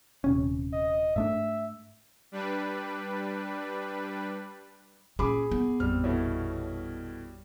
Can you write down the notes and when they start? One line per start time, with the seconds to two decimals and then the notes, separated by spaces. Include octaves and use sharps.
0.24 D#1 C3 C#4
0.73 D#5
1.16 G#2 A3 D4 E5
2.32 G3 D4 B4
5.19 A#2 C#4 G#4 B5 D6
5.52 B3
5.80 A1 F2 G3 C4 F6
6.04 B2 E4 A4 C#5